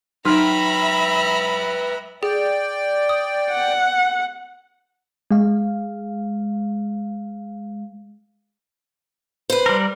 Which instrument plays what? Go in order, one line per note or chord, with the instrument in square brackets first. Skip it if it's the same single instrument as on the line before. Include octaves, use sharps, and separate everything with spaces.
[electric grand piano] F#3 F6 [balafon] D#4 [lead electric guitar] B4 G5 [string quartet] E5 A#5 B5
[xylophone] G#4 [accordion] D5 G5
[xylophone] D#6
[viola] F#5
[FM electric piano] G#3 F5
[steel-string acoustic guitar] B4 C5
[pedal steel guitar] G3 A#4